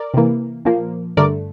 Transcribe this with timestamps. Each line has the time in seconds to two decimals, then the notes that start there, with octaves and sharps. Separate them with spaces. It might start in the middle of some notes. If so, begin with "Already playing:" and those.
Already playing: A#4 D5
0.14 C3 E3 A#3
0.65 A#2 F3 A#3
1.17 G2 D3 A3 A#4 D5